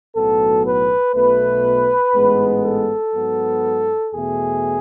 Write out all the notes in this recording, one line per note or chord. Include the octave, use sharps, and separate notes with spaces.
B1 A2 F#3 B3 A4
B4
B1 B2 A3 B4
A1 G#2 G#3 B3
A4
G#2 F#3 B3
E2 B2 A3 G#4